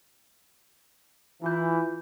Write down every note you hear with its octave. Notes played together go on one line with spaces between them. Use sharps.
E3 E4 F4 G6